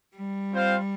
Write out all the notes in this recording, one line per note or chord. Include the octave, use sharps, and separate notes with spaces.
G3
C4 F4 C5 F5